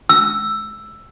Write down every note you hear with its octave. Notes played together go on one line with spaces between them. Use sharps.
E6